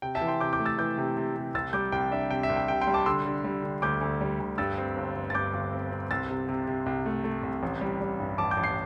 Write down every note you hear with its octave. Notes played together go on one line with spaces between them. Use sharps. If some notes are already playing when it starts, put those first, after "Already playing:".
C3 G5
E5 A5
E3
G5 C6
C3 D6 G6
D6 G6
A3
E6 A6
E3 D6 G6
C3
C3
C3
C2 E6 A6
G3 D6 G6
C2 G5
D4 E5
C3 G5
E5
C2
G5
C3 G5
G5 C6
G3
A5 D6
D3 C6 E6
D3
G3
D3
D2 D6 G6
D2
G3
D2
G2 E6 A6
C4
G1
G1
A6
G2 D6 G6
G1
C4
C4
C2 E6 A6
C3
C3
C3
C2
A3
A3
C2
A1
G3
G3
G2
A1 A5 D6
D6 G6
A1
G6 C7